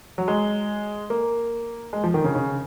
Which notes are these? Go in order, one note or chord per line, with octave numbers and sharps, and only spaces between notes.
F#3
G#3
A#3
G#3
F3
D#3
C#3
C#3